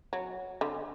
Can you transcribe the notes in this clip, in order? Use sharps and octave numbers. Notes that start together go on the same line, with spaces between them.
F#3
D3